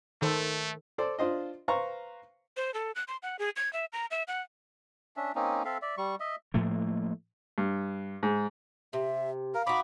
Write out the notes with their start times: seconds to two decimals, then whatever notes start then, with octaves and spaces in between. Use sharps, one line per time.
0.22 D#3 A3 A4 C5
0.98 A4 C5 D5
1.19 D4 F4 C5 D#5
1.68 B4 C5 F5 A#5 C#6
2.57 C5
2.74 A4
2.95 F#6
3.08 C6
3.23 F#5
3.39 G#4
3.56 G#6
3.73 E5
3.93 A#5
4.11 E5
4.28 F#5
5.17 C#4 D4 E5
5.35 A#3 C4 C#4 D#4
5.65 C4 A4 E5 F5
5.82 D5 E5
5.98 G3 C#6
6.20 D#5 E5
6.54 A2 F3 A3 A#3
7.58 G2
8.23 G#2
8.93 C3 E5
9.54 A#4 F5
9.67 D#4 F#4 B5 D6